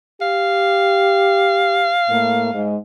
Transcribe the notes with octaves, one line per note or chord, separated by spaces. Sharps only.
G4 F5
A2 A3 A#3
G#2 G#3